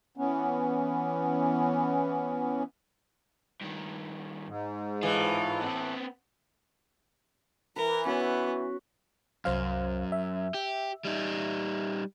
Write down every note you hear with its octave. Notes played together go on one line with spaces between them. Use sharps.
E3 B3 C#4
G2 D#3
G#2
A2 E3 F4
B3 C4
E3 A#4 B4
B3 C#4 F#4
C2 F#2 C5 F5
E5
G4
G3 D#4